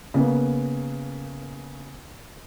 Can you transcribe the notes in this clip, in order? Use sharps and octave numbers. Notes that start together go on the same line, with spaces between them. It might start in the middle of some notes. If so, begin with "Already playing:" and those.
C#3 A#3 B3